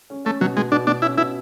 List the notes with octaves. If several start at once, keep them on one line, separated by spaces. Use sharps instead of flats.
C#4
A3 C#4
B2 F#3
B2 G#3
B2 D4
B2 D4
C#4 E4
B2 E4